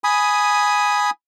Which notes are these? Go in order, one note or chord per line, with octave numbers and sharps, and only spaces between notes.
G#5 B5 D#6